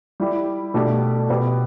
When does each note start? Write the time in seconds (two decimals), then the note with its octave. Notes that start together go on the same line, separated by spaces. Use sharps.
0.20 G3 E4 G4
0.74 B2 A3 D4 G4
1.29 B2 B3 G4